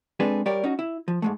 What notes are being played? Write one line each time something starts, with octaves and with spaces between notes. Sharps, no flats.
G#3 C4 D4 G#4 A4 B4
G3 G4 A#4 C#5 D5
C#4 D#4 F#4
E4
F3
G#2 G#3 A3